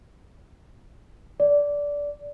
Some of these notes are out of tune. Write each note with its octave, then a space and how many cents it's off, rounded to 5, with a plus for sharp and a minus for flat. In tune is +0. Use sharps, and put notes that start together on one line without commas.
D5 -15